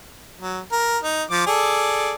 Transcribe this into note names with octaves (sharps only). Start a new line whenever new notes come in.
F#3
A#4
D#4
F3 D6
G#4 A4 D5